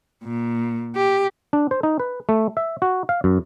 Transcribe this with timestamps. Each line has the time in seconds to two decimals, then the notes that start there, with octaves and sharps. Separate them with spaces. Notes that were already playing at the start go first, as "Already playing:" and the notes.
0.24 A#2
0.96 G4
1.53 D4
1.71 C5
1.83 D#4
2.00 B4
2.29 A3
2.57 E5
2.82 F#4
3.09 F5
3.24 F#2